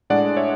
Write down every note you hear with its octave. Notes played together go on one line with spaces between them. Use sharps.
A2 G#3 D4 D5 F#5
C#5 E5